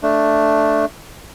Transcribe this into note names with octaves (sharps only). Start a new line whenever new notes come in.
A3 D4